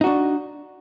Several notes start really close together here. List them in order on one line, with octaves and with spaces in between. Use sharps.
D#4 F#4 D4